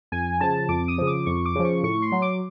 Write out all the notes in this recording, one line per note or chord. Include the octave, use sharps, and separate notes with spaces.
F2 G#5
C#3 F3 A5
F2 D6
D#6
C#3 F3
D6
F2 C#6
D6
C#3 F3
C#6
A2 C#6
C6
F#3
D6